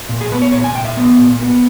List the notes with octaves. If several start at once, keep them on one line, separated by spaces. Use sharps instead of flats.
A#2
G#4
B3 B4
C#5
A#2 C#5
G#5
A#2 G5
E5
B3
A#2
B3